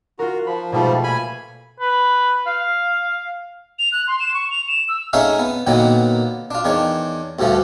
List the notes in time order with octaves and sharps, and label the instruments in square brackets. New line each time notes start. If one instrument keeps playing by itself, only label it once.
[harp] F4 A#4 [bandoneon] F#4
[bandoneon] F3 [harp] B5
[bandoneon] G#2 F3 G3 [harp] B2 A3 F4
[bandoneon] A#2 G#5 B5
[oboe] B4
F5
[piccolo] F7
F#6
C6
E7
C#6
F7
E7
E6
[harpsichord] A3 C#4 D#4 G#4 E5 F5
B3
A#2 D3 D#3 F#3 A#3 B3
D4 F4
E2 D#3 D4 C#5
D2 G2 D3 F3 A3